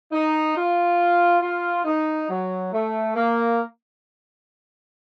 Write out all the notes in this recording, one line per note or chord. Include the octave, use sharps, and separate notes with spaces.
D#4
F4
F4
D#4
F#3
A3
A#3